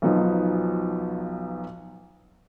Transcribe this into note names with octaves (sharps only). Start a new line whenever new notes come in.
B1 F3 F#3 B3 D#4 F4